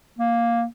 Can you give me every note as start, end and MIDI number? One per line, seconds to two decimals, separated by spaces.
0.18 0.64 58